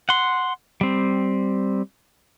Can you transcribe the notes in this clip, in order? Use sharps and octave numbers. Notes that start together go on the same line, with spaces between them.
F#5 C6
G3 C4